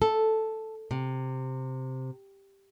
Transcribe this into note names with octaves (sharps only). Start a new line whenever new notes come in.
A4
C3